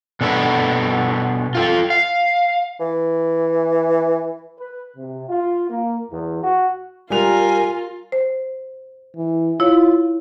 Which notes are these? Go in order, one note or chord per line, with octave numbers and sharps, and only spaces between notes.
B2 D4 A4 B4
F4 A4
F5
E3
B4
C3
F4
A#3
E2
F#4
G3 F4 A#4 G#5 F7
C5
E3
E4 F4 C#5